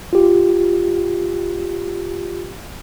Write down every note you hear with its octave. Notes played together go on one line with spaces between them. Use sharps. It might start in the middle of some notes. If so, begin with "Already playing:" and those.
F4 G4